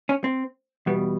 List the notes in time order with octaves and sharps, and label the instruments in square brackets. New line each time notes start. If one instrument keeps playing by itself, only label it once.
[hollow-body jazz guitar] C#4
C4
E2 B2 G3 B3